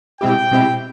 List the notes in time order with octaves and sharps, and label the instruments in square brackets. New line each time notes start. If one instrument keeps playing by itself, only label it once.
[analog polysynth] B2 G#3 C4 E4 G4 [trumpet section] G5
[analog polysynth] B2 G#3 C4 E4 G4